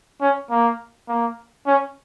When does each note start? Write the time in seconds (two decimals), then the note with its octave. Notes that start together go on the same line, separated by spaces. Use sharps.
0.21 C#4
0.50 A#3
1.08 A#3
1.67 C#4